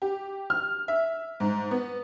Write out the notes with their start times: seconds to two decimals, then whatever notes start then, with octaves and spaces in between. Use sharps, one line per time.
0.02 G4
0.50 F6
0.88 E5
1.40 G#2
1.71 B3